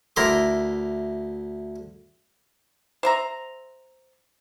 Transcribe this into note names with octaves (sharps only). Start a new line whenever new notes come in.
D2 E4 A#4 A#5 C6 D6
C5 E5 A#5